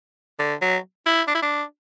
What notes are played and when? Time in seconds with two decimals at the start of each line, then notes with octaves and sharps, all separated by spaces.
0.39 D3
0.62 F#3
1.06 E4
1.28 D4
1.35 E4
1.42 D4